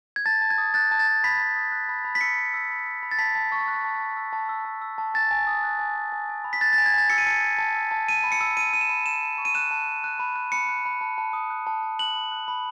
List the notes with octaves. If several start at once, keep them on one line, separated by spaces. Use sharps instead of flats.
G#6
A5 A6
A5
G#6
D#6
F#6 A6
A5
A6
A5
B5 B6
B5
D#6
F#6
B5
B5
B6
E6 C#7
B5
E6
B5
E6
B5
A6
A5 B6
A5
C#6
F#6
A5
A5
E6
A5
E6
A5
E6
A5
G#5 A6
G#5
D#6
F#6
G#5
G#5
G#5
G#5
B5
B6
F#6 A6
A6
G#5
G#6
G#5 A6
E6 C#7
D#7
A5 C#7
E6
A5
E6
A5
E6 D#7
B5
C#7
E6
B5 D#7
E6 D#7
E7
B5
A5 E7
A5
C#6
D#7
F#6 E7
A5
A5
F#6
B5
F#6
B5 C#7
F#6
B5
A5
A5
D#6
F#6
A5
A5
F#6 F#7
B5
F#6
B5